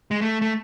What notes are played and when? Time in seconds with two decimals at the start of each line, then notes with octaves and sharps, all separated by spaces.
0.11 G#3
0.21 A3
0.41 A3